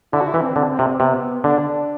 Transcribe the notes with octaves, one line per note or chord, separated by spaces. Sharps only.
D3 E4
F#4
E4
E3
C4
D3
C4
C3
C3 B3
D3 D4